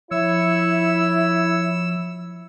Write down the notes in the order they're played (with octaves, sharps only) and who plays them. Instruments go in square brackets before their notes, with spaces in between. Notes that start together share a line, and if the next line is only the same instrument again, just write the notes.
[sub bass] F3 [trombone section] E4 [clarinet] C#5 [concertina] E6